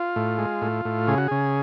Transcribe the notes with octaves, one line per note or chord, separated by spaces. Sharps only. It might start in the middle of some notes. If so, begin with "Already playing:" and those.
Already playing: F4
A2
G#3
A2
A2
C#3 G#4
F#4
C#3 G#4